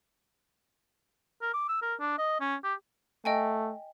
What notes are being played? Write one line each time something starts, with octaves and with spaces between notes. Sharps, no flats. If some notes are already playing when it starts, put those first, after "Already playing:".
A#4
D6
E6
A#4
D4
D#5
C#4
G4
A3 D#5 G5 G#5